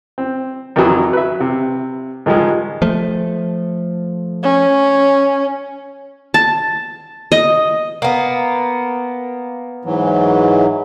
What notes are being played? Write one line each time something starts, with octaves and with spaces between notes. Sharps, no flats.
C4
F2 D#3 E3 F#3
B4 E5
C3
G#2 D#3 F3 G3 G#3
F3 A3
C#4
A5
D#5
A#3 B3
G#2 E3 F#3